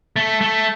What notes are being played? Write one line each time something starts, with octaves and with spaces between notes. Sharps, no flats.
A3
A3